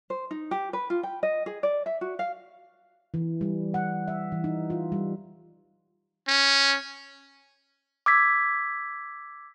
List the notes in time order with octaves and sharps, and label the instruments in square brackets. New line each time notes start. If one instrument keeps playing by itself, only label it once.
[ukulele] C5
D#4
G4
B4
F4
G5
D#5
G#4
D5
E5
F#4
F5
[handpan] E3
G3
F#5
E5
E3
D#4
F4
G3
[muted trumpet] C#4
[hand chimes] D6 E6 G#6 B6